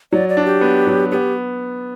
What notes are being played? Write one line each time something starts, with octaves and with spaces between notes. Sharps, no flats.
F#3 D5
D5
D4
G4
B3
F#3
B3 G4